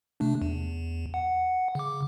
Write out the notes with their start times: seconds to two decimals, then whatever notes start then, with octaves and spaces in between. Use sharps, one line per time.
0.20 C3 A3 D4
0.42 E2
1.14 F#5
1.75 C#3 D6